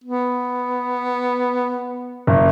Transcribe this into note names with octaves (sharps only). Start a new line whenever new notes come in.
B3
F#1